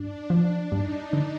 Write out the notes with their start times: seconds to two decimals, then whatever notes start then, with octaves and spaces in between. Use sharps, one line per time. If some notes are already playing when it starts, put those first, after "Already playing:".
Already playing: G2 D4
0.30 F3
0.71 G2 D#4
1.13 D3